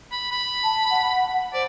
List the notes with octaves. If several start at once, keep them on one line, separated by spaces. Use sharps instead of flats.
B5
B5
A5
F#5
C5 D5